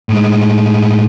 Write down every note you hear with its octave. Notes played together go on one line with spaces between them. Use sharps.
A2 G#3